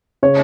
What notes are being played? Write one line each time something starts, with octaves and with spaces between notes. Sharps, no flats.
C#3 C#5